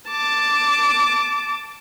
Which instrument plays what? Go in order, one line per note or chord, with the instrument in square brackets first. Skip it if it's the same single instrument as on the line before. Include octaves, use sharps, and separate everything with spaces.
[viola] A5 D6